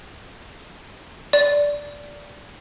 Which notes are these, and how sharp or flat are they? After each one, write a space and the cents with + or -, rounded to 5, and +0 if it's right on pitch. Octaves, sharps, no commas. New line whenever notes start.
D5 -10